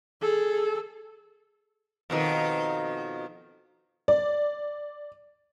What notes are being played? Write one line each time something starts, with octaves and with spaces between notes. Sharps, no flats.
G#4 A4
F2 B2 D#3
D5